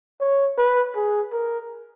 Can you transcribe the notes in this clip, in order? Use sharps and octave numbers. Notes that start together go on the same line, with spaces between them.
C#5
B4
G#4
A#4